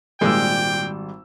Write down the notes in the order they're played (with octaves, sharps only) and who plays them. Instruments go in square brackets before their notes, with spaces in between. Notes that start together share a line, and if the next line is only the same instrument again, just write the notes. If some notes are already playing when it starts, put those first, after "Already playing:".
[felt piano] G#1 G3 E6 [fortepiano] A#2 G#3 [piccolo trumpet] G5